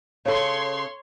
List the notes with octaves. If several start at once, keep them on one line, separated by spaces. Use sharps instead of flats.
C#3 A4 C#5 C6